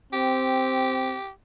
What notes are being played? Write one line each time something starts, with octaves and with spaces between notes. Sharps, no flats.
C4 G4